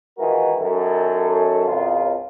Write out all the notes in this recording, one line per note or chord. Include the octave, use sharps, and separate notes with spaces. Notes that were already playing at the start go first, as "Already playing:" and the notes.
D#3 E3 G#3 F4 F#4 A#4
F#2 D#3 A4
G#1 C#2 F4